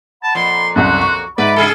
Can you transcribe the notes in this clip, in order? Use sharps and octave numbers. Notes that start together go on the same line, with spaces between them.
F#5 A5 B5
F2 A#2 C6
C2 F#2 F#4 C6 F#6
C#6
G#2 B4 D5 E5 F#5 B5
C#3 F4 G#4 A4